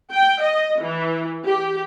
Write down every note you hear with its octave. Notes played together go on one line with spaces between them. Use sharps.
G5
D#5
E3
G4